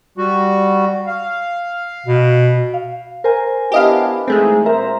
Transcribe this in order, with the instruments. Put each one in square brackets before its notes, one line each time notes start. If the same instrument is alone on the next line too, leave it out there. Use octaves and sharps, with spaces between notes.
[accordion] G3 F#4
F5
[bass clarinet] B2
[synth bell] F5
A#4 C5 G#5
[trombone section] B3 D4 E4 [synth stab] G4 D#5 F5
[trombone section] E3 D#4 G#4 [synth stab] G#3 A3 C4
[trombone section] A#2 C5 [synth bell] A#4 E5 A#5